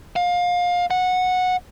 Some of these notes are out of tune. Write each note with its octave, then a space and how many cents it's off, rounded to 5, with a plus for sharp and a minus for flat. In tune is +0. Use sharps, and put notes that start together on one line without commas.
F5 +25
F#5 -15